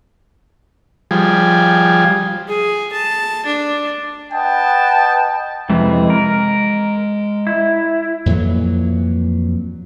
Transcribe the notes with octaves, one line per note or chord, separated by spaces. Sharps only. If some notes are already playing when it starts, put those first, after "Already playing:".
F3 G3 G#4
G#4
A5
D4
B4 D#5 F#5 G5 A5
F2 C3 E3 G#3
A#4
E4
F2 A#2 E3 F#3